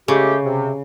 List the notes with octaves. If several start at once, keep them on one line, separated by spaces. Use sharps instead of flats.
C#3 G#3 A3 G4
C3